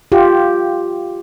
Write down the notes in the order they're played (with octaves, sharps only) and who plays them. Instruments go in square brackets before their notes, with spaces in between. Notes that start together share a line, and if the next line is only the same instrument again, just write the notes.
[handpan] F4 G4